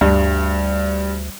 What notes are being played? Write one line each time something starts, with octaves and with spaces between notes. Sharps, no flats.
D2 G2